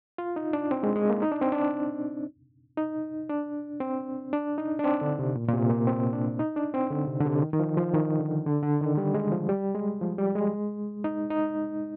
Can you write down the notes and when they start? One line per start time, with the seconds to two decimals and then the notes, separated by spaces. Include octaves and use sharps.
0.18 F4
0.36 D#4
0.53 D4
0.71 C4
0.83 G#3
0.96 G#3
1.10 A#3
1.22 D#4
1.32 D4
1.41 C4
1.52 D4
2.77 D#4
3.29 D4
3.80 C4
4.33 D4
4.58 D#4
4.79 D4
4.84 C4
5.01 D3
5.19 C3
5.36 A#2
5.48 A#2
5.53 C3
5.70 A#3
5.87 C4
6.13 D4
6.39 D#4
6.56 D4
6.74 C4
6.90 D3
7.07 C3
7.20 D3
7.25 C3
7.42 D#3
7.53 D#3
7.59 F3
7.77 F3
7.94 D#3
8.20 D3
8.46 D3
8.63 D3
8.81 D#3
8.97 G3
9.14 G#3
9.32 F3
9.49 G3
9.75 G#3
10.01 F3
10.18 G3
10.35 G#3
11.04 D#4
11.30 D#4